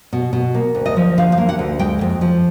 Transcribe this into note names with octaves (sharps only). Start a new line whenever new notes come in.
B2
B2
A#3
D2
D#5
F3
D3 F5
F5
A#3
F#5
D2
G#3 G5
F2
F3